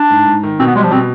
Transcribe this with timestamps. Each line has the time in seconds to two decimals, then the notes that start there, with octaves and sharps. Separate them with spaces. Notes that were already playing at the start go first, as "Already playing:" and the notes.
Already playing: D4
0.10 G#2
0.26 G#2
0.43 D#3
0.59 B2 C4
0.67 B3
0.76 G3 G#3
0.84 F3
0.91 B2 C4